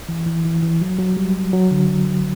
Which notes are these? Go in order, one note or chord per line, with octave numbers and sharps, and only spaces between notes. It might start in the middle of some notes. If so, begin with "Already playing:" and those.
E3
E3
E3
E3
F#3
F#3
G3
F#3
D3